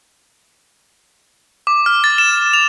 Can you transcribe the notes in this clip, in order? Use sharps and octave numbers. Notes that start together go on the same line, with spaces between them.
D6
F6
A6
E7
F7